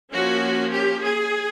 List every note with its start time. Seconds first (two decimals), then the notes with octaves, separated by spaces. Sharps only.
0.12 F3 A#3 C#4 F#4
0.71 G4
1.02 G#4